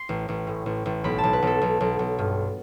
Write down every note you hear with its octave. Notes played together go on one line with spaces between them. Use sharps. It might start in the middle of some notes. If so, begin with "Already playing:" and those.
Already playing: C6
A1
A1
A2
A1
A1
B1 B5
B1 A5
B4
B1 A4
B1
B1
B1
G2